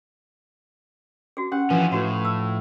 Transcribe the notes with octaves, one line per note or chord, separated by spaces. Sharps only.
F#4 G#4
C#4 G4 F#5
E3 F3 C#4 E4 B4
A2 F#4 G#4 B4
E6